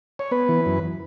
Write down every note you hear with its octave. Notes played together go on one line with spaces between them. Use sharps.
C#5
B3 B4
E3
F#2